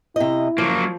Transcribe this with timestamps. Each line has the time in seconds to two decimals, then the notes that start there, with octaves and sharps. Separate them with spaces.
0.16 C3 E4 D#5
0.58 F3 F#3 A#3